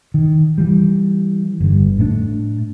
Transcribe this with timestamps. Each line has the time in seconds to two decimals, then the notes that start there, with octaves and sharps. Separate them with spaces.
0.14 D#3
0.58 E3 G3
1.60 G1 G2
1.98 A2 A3 A#3 D4